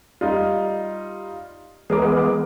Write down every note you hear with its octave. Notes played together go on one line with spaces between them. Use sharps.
G3 D#4 F4
E3 G#3 B3 G#4 A#4 D6